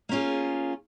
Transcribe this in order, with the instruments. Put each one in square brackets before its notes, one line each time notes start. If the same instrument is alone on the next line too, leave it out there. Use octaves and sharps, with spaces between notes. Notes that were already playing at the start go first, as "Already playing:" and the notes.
[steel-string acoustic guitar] A#3 C#4 F4 G#4